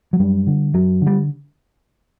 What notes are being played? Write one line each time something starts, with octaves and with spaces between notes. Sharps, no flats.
F#3
F#2 G3
D3
F#2 F#3
D3 G3